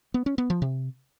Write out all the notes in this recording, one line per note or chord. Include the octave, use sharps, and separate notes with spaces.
B3
C#4
B3
F3
C3